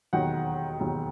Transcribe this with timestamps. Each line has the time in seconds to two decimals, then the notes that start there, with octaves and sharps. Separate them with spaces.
0.13 E1 D#2 D#3 F#3 F#5
0.79 E1 D#2 D#3 F#3